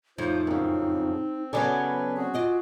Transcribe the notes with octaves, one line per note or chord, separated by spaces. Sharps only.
F2 A2 D#4 F4 C5
F#2 C#3 C4
C#3 F#3 B3 A4 B4 D5 G#5
C4 F#4 G#4
F4 D5 D#5